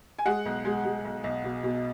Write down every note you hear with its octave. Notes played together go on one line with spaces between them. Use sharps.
G#5
G#3 F#5
B1
G#3
G#3
B1
B1
B2
B2